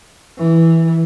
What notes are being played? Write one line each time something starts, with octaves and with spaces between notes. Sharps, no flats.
E3